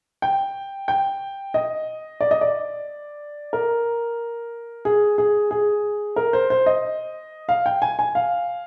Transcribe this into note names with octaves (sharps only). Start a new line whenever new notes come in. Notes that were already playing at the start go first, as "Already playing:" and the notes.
G5
G5
D#5
D5
D#5
D5
A#4
G#4
G#4
G#4
A#4
C5
C5
D#5
F5
G5
G#5
G#5
F5